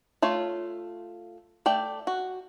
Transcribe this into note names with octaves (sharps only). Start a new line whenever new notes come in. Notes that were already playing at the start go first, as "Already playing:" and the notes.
A3 F4 C#5
A3 D5 G5
F#4